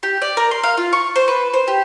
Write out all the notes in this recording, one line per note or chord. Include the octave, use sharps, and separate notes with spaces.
G4
D5
A#4
C6
F5
F4
C#6
C5
B4
C5
G4